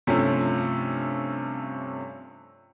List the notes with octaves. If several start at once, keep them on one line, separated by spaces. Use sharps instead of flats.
G2 C3 F3 A3 C#4